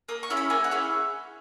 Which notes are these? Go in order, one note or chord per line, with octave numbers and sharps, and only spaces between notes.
A#3 D#6
C#6
C#4 E4 G#4
B5
A#3 G#5
F#5
C#4 E4 G#4